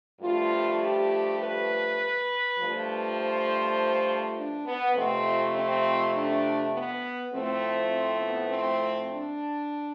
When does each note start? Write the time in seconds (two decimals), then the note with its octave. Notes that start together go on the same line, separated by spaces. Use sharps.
0.21 G2 F3 A3 F4
0.81 G4
1.39 B4
2.59 G2 F3 A3
3.17 C5
4.37 D4
4.66 B3
4.95 F2 C3 F3 A3 C4
5.55 C4
6.14 D4
6.72 B3
7.32 A2 F3 A3 C4
7.92 C4
8.22 B3
8.50 C4
9.10 D4